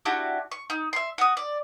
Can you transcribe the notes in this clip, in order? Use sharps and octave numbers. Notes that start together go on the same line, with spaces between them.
D4 E4 F#4 G4
C#6
D#4
E5 C6
F#4 D#6
D5